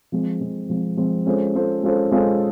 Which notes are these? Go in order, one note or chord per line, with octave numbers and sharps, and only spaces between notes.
F3 G#3 C4
F3 G#3 C4
F3 G#3 C4
F3 G#3 C4
G#3 C#4 F4 A4 C5
G#3 C#4 F4 A4 C5
G#3 C#4 F4 A4 C5
G#3 C#4 F4 A4 C5